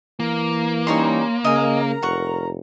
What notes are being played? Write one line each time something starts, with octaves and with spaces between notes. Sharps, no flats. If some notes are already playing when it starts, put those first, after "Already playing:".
E3 A#3
G3 C#4 D#4 C#5 A#5 C6
C#3 A#4 D#5 F5 G#5 A#5
F1 F#5 C#6